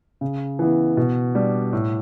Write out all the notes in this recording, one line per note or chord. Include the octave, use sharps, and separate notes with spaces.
C#3
E3 B3 E4
B2
G3 D4
A2